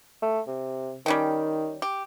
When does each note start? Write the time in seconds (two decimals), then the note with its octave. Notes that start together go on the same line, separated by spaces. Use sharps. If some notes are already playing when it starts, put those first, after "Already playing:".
0.22 A3
0.47 C3
1.06 D#3 G3 C#4 G5
1.82 G4